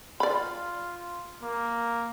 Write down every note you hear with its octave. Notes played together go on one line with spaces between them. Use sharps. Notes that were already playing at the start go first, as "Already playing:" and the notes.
F4 D5 B5
A#3